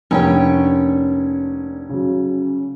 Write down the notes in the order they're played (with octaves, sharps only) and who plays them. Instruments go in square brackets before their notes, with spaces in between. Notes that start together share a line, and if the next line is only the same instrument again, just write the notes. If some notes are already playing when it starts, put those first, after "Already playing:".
[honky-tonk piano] F1 [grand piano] A#3 D4 [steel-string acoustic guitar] C#4 C#5 G5
[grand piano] C#3 F#3